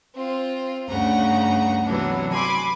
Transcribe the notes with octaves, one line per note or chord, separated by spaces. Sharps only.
C4 F4
D2 G2 C#3 F#5 A#5
C3 E3 F#3 B3 D4
G#5 B5 C6 D6